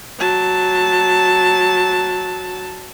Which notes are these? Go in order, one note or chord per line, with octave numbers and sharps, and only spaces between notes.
F#3 A5